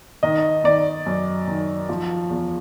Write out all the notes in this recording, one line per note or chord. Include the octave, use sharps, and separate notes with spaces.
D#3 D#5
D#3 D5
F#2
D#3
F3
E2